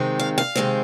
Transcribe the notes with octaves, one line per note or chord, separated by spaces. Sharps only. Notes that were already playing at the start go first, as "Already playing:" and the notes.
Already playing: C3 D#3 G#3 C4
F5
F5
C3 D#3 G#3 C4